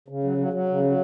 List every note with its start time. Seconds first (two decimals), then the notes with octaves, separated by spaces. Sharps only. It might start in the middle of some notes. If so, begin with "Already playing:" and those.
0.08 C#3
0.24 F#3
0.38 F#3
0.53 F#3
0.69 C#3
0.84 F#3